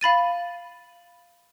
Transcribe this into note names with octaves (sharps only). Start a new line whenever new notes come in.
F5 B5 A6 D#7